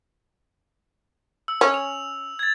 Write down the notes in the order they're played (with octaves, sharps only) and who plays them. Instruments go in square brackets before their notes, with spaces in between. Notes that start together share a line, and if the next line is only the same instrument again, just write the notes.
[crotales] E6
[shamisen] C#4
[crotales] F7
G#6 A6